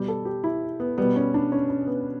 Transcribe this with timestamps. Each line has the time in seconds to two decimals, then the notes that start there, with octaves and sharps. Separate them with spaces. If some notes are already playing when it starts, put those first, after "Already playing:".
Already playing: B2 G3 G4
0.08 A4
0.25 G4
0.44 E4
0.80 B3
0.98 B2 G3 B3
1.16 C#4
1.34 D4
1.52 C#4
1.70 C#4
1.87 B3